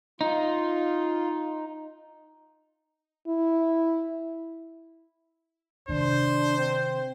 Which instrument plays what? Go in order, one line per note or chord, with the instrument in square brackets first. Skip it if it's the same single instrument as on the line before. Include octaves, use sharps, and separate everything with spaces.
[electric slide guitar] D#4 [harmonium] F4
[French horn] E4
[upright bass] C3 D#3 [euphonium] D4 [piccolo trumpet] C5
[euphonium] C4